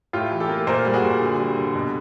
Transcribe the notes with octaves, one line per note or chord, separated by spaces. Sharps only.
A2 F4 G4
E3
G4 A4
A#3
A#2 A#4 C5
G3
F#4 G#4
A#2
D3
G3
D3
B2